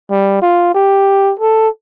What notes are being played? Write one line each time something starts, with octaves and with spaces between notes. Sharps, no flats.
G3
F4
G4
A4